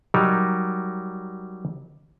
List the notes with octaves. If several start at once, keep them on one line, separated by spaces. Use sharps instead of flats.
F#3 G3 D#4 A#4